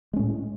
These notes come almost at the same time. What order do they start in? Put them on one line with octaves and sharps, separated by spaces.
G#3 C#4 A2